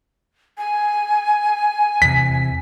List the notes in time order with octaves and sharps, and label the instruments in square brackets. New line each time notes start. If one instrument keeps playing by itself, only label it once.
[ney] G#5
[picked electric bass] E2 C3 [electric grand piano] B6